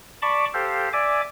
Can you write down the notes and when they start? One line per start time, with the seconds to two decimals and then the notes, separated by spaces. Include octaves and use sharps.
0.22 D5 A5 B5 C#6 D6
0.54 G4 A4 C5 F5
0.93 D5 E5 G#5 D6